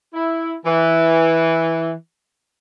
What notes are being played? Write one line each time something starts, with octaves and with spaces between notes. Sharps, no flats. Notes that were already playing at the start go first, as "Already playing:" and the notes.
E4
E3